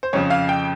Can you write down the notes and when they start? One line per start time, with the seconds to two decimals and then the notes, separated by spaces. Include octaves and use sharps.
0.03 C5
0.13 F2 C#3 F3 C#5
0.30 F5
0.49 G5